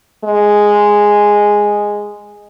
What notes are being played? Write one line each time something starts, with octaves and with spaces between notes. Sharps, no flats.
G#3